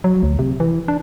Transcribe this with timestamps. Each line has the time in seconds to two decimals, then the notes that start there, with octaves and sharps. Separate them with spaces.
0.04 F#3
0.23 D2
0.39 C3
0.60 E3
0.88 D4